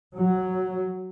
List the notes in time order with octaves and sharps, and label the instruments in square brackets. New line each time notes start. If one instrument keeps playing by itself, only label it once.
[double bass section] F#3